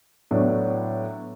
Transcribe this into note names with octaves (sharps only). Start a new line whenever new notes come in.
A2 F#3 B3 D4